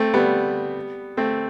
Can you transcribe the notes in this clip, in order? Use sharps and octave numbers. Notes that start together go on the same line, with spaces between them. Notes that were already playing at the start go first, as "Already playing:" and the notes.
Already playing: A3 C4
G3 B3
A3 C4